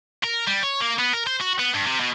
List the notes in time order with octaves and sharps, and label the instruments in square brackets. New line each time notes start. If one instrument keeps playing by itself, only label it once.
[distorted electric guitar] A#4
G3
C#5
A#3
B3
A#4
C5
F#4
B3
G2
C3
B2